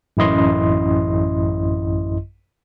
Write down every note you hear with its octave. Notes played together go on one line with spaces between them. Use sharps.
A1 F#2 E4 D#5 C6